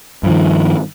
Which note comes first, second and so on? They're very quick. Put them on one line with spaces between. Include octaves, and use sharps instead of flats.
G2 F3 D#3